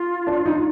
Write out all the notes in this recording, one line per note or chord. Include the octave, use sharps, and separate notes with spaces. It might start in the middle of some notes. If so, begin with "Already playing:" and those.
Already playing: F4
D4
D#4